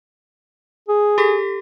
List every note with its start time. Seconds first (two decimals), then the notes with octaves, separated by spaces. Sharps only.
0.89 G#4
1.18 G4 A4 B6